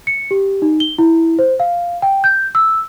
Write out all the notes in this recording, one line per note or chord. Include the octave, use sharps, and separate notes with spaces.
C#7
G4
D#4
G7
E4
C5
F5
G5
G6
E6